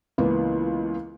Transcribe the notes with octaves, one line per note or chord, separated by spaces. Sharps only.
C#2 E3 A#3 B3